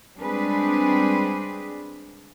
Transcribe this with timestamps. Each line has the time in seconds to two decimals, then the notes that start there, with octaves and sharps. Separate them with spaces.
0.17 G3 G#3 C4 D4 G#4 B4